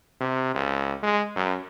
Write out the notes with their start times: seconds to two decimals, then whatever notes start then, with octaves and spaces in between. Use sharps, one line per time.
0.21 C3
0.54 C#2
1.03 G#3
1.36 F#2